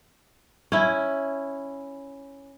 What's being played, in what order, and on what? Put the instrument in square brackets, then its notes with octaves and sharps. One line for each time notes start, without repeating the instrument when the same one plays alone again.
[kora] C#4 E4